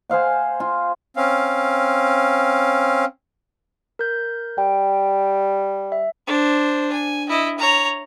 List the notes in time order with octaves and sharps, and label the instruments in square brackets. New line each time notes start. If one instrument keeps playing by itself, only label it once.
[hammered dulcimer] G#4 C5 F5 F#5
F4
[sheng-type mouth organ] C4 C#4 F5
[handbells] A#4 G6
[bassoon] G3 [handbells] G5
[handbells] E5
[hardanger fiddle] D4 C5
G#5
E4 D#5
C#5 A#5